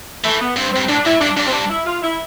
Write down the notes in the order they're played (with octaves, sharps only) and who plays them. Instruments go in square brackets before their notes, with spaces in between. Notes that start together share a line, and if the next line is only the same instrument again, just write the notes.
[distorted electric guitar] E3 [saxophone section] A3
[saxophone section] B3
[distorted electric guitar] G2 [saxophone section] C4
[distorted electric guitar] G2 [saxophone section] C4
[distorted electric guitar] A2 [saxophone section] D4
[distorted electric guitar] A2 [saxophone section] E4
[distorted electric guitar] G2 [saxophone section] D4
[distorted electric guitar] G2 [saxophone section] D4
[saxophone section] C4
D4
E4
F4
E4